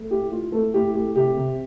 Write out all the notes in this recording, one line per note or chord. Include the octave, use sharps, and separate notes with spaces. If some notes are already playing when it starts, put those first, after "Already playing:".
Already playing: A3
A2 G4
A2 F4
A3 A4
A2 G4
A3 G4
C3 G4
C3